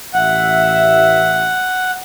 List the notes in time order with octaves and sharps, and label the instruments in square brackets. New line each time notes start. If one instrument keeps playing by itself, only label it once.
[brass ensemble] A1 E5 [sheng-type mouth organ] F#5